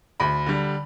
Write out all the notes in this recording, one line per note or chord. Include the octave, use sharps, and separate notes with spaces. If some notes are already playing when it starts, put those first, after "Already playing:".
D2 B5
D3 G3